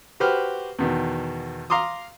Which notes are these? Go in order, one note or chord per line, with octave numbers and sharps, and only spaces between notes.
F#4 G4 B4 C5 F6
E2 B2 D#3
F5 A#5 C6 D6 D#6